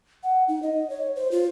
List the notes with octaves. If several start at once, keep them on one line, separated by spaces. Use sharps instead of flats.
F#5
D#4
D#5
C#5
C5
F4